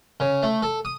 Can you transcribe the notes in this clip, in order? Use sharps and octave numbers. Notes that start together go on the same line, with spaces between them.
C#3
A3
A4
D#6